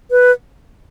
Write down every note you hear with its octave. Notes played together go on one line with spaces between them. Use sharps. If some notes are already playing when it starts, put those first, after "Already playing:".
B4